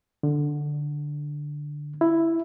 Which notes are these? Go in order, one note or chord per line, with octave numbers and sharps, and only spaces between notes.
D3
E4